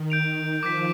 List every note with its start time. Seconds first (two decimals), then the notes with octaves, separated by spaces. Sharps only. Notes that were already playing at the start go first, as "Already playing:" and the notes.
Already playing: D#3
0.10 G6 D7 F7
0.62 F3 D6 G6 B6